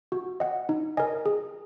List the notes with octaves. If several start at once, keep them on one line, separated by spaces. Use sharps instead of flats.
F#4
D#5 F#5
D#4
A#4 D#5 G#5
G#4